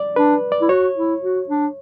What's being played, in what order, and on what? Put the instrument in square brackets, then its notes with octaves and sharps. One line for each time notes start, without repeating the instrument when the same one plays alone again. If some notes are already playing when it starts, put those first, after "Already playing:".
Already playing: [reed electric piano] D5
[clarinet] D4 [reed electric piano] B4
[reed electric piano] D5
[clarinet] E4
[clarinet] F#4 [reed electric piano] C#5
[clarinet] E4
F#4
D4